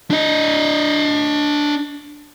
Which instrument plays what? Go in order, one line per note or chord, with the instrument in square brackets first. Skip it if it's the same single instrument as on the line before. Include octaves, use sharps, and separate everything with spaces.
[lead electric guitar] D4 D#5